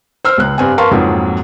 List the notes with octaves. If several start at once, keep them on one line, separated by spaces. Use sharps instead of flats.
C5 E6 F6
C#2 F#6
G2 C4 G#5
A#4 B4 F5 A5 C6 C#6
A#1 F2 G#2 F3 F#3